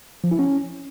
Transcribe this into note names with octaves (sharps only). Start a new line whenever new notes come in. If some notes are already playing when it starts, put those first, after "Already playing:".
F3
E4
C#4